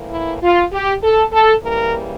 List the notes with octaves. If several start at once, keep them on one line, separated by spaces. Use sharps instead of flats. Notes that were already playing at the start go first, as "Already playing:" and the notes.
Already playing: A2 E3 A#3
E4
F4
G4
A4
A4
C#3 E3 G3 A#3 A#4